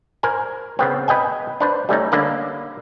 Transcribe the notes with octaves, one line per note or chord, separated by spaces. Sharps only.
A#4 C5 G#5
C#3 B3 C4
B4 D#5 G5 G#5
D4 B4 C5
G3 A3 C#4 D#4
D3 A#3 C#4 B4